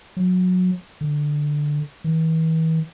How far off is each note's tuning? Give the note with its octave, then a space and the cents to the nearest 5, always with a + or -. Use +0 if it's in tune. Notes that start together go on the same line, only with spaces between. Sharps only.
F#3 -20
D3 +5
E3 -40